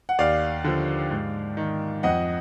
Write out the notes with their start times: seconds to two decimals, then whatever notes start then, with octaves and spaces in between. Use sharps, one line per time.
0.09 F#5
0.19 D#2 D5 F5
0.64 D3 F3
1.11 G#2
1.57 D#3
2.03 F2 D#5 F#5